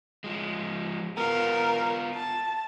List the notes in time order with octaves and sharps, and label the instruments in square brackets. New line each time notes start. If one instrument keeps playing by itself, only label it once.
[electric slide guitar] F3 G#3
[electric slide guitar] B3 F4 [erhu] A#4
[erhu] A5